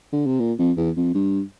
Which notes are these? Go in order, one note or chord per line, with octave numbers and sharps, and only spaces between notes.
D3
C3
A#2
F2
E2
F2
G2